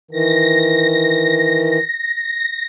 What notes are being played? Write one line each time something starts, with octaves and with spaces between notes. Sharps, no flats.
D#3 E3 A#6